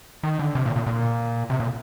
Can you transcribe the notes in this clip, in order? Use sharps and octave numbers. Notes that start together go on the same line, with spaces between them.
D#3
D3
C3
A#2
A#2
A#2
C3
A#2